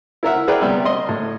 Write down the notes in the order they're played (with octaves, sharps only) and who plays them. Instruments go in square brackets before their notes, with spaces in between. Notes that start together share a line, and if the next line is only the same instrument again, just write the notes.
[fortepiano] E4 A#4 E5 F#5
G#4 A#4 B4 D5 E5 G5
C3 G3 B3
D#5 C6
A2